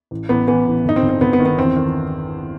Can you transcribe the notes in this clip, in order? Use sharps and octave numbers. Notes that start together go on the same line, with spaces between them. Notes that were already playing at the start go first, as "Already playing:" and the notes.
A1
A1 B3
E3 B3
A1
G1 D#4
C4
G1
C4
G1 B3
B3
D#3
B3
E2 C4
D#3